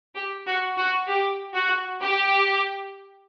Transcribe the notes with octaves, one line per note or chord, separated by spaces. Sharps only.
G4
F#4
F#4
G4
F#4
G4